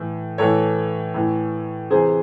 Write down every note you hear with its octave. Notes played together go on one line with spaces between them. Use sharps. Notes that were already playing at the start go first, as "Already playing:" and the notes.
Already playing: A2 E3
A2 E3 A4 C#5
A2 E3
C3 E3 G#4 C5